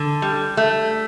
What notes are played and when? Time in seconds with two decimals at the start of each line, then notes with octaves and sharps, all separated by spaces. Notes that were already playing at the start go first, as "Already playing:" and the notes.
Already playing: D3
0.22 G3
0.57 A3